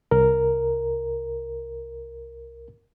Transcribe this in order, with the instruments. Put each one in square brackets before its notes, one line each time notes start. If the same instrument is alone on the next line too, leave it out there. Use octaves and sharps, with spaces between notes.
[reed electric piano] C2 A#4